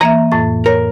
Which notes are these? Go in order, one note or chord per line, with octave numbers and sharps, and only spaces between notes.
E3 A#3 D#5 E5 A#5
F2 A2 A6
A#4 C#5